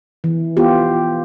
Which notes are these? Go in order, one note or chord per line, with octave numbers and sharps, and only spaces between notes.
E3
B3 F4 G4